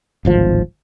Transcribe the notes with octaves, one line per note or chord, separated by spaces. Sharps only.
D1 G#1 F3